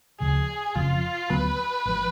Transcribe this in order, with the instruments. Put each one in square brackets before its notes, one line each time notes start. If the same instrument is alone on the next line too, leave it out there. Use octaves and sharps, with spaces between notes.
[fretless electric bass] D2 C#3 F3 [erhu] G#4
[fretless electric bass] F1 F2 C#3 F3 [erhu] F4
[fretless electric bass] D2 D3 F#3 B3 [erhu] B4
[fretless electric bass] G#1 F3